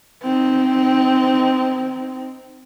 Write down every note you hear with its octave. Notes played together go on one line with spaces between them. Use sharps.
C4 D#4